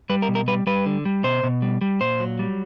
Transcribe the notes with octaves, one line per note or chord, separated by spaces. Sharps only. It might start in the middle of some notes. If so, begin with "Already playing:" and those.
G3 B4
A#4
B2
A#4
G3 B4
G3 B4
D3
G3
B2 C5
B2
G3
G3
A#2 C5
F#3
G3